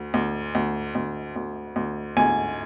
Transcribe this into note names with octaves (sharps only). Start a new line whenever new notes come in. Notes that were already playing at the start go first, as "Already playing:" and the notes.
Already playing: D2
D2
D2
D2
D2
D2
D2 G#5